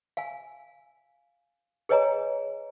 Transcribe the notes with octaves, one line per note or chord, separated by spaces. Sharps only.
F5 G#5
G#4 B4 C#5 D#5 G#5 A#5